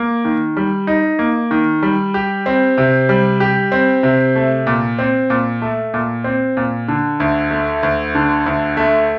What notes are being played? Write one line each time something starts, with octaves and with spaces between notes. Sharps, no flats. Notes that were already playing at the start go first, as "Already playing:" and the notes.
Already playing: A#3
D#3
G3
D#4
A#3
D#3
G3
G4
C4
C3
G3
G4
C4
C3
A3
A#2
C4
A#2
A3
A#2
C4
A#2
D3
D2
A3
D2
D3
D2
A3